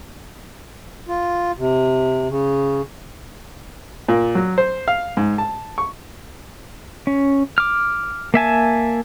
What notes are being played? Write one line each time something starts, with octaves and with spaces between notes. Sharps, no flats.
F4
C3
C#3
A#2
F#3
C5
F5
G#2
A5
C#6
C#4
D6 F6
A#3 E5 G#5 A5